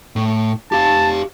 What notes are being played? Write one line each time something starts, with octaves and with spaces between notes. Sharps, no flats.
A2
G4 F5 A5